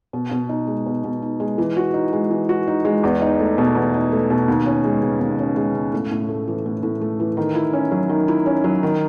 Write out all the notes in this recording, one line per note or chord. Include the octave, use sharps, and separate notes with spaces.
B2
B2
D#4
G#3
B2
B2
D#4
G#3
E3
F#4
D#4
G#3
E3
F#4
D#4
G#3
E2
D#4
A3
B2
E2
D#4
A3
B2
D#2
C#4
G#3
C#3
D#2
C#4
G#3
C#3
A2
A2
A3
E3
A2
A2
A3
E3
D#3
E4
C#4
F#3
D#3
E4
C#4
F#3
D#3